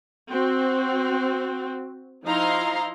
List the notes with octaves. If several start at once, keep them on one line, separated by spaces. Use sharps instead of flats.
C4 F#4
F3 D#4 E4 F5 A#5 C6